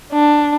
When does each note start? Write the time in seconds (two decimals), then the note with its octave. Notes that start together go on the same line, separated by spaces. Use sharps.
0.13 D4